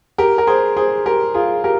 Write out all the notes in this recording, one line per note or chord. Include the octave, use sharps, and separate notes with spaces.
G4 A#4
A#4
G#4 C5
G#4 C5
G4 A#4
F4 G#4
G4 A#4